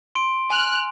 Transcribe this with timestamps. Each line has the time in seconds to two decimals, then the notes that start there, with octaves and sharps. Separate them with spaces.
0.15 C6 D7
0.50 G#5 F6 F#6